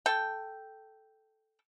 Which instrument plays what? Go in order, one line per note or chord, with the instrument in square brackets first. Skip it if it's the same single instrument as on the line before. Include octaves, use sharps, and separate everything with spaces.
[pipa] A4 G5